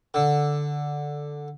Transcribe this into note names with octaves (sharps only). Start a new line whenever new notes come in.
D3